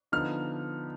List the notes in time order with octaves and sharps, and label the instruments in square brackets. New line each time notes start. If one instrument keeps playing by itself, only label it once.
[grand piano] D3 F3 B3 D#4 F6